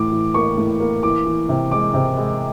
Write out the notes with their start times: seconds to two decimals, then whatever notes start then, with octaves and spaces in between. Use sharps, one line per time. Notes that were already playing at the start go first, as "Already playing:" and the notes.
Already playing: A2 E3 D6
0.12 E3
0.34 A#3 C#6
0.58 A2
0.80 A#3
1.03 E3 D6
1.26 E3
1.49 C3
1.71 G#3 D6
1.94 C3
2.17 G#3